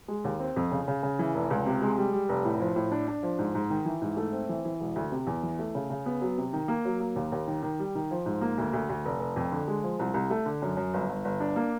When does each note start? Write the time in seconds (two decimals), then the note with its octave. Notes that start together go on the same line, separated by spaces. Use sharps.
0.08 G#3
0.24 D#2
0.39 C4
0.56 F2
0.71 C#3
0.88 C#3
1.03 C#3
1.19 E3
1.35 F1
1.50 C#2
1.66 C3
1.82 G#3
1.97 G3
2.13 G3
2.29 F1
2.45 A2
2.60 F3
2.76 A2
2.92 D4
3.08 D4
3.23 F3
3.39 G#2
3.55 G#2
3.70 D#3
3.85 E3
4.01 G#2
4.17 A3
4.32 C4
4.49 E3
4.65 E3
4.80 E1
4.96 D2
5.12 C3
5.27 E2
5.43 E3
5.59 A3
5.75 C#3
5.90 C#3
6.06 B3
6.21 F#3
6.38 C3
6.53 D#3
6.68 A#3
6.85 F#3
7.00 A#3
7.16 D#2
7.32 D#2
7.47 D#3
7.63 D#3
7.79 G3
7.95 D#3
8.11 F3
8.26 G#2
8.41 A#3
8.58 D2
8.73 D2
8.89 D2
9.05 F1
9.20 F1
9.36 F2
9.52 D3
9.68 G#3
9.83 F3
9.99 C2
10.14 C2
10.30 A3
10.46 D3
10.62 F#2
10.77 F#2
10.94 G1
11.09 G1
11.25 G1
11.40 D4
11.56 A#3